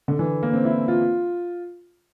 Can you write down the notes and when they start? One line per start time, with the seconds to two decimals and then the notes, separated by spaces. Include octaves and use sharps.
0.08 D3
0.19 E3
0.43 A#3
0.53 C4
0.65 E4
0.88 F4